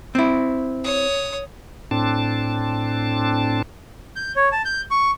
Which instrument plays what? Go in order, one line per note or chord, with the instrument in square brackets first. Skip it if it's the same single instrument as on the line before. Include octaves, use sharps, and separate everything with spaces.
[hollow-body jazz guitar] C4 E4
[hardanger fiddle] C#5 D#6
[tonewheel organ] A2 C4 D4 A5
[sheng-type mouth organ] G6
C#5
A5
G6
C#6